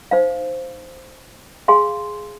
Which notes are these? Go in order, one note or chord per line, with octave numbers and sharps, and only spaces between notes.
D#4 C5 F5
G#4 F5 G#5 C6